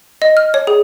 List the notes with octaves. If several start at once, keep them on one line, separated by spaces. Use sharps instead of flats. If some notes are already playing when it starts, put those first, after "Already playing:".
D#5
F6
C#5
G#4